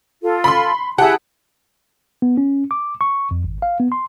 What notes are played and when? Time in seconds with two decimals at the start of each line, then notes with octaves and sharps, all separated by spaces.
0.22 F4 A4
0.44 B5 C6
0.98 E4 G4 G#4 F#5 A5
2.22 B3
2.37 C#4
2.71 D6
3.01 C#6
3.31 F2
3.44 G#1
3.62 F5
3.80 B3
3.92 C6